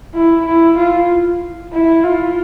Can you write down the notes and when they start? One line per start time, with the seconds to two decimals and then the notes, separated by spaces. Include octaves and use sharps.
0.14 E4
0.45 E4
0.77 F4
1.73 E4
2.04 F4